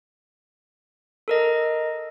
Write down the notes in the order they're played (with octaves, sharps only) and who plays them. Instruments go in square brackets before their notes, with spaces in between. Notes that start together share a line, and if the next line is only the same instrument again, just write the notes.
[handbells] A4 A#4 D#5